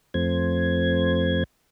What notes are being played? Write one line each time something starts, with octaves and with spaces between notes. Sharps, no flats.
F2 F3 A3 C4 C5 G#6